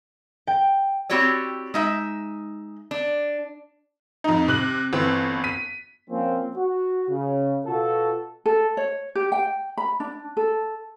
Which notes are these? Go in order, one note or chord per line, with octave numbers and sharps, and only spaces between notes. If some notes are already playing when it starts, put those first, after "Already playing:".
G5
C4 E4 F#4 G4 C#5 D5
G#3 D#4 E5
D4
F2 D#4
C3 F#6 F#7
G1 E3 C4
B6 D#7
F3 A#3 C4 C#4
F#4
C#3
B2 F4 F#4 A4
A4
C#5
G4
G5
B5
D4
A4